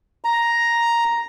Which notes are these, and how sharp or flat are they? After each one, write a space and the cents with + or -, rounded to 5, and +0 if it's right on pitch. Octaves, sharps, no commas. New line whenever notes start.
A#5 +5